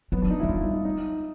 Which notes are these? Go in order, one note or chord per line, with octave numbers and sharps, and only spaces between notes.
F#3 B3
D4
D#4
E4
F#3
G3 F4
E4
D#4
D#4